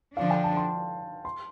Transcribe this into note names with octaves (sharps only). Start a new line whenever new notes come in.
D3 F3 D4 F5
G5
A5
C6
C6